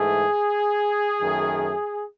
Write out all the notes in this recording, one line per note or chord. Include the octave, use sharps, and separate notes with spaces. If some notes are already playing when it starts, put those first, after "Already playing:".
Already playing: G#2 E3 A3 G#4
F#2 D#3 A3